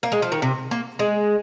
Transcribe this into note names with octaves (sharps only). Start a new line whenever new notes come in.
A#3
G#3
F3
D#3
C3
A#3
G#3